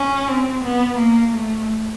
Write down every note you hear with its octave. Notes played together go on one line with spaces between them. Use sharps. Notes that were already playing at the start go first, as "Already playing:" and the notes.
Already playing: C#4
C4
B3
A#3
A3